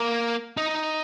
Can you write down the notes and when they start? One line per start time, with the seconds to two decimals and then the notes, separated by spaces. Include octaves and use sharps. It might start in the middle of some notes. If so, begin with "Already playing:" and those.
Already playing: A#3
0.57 D#4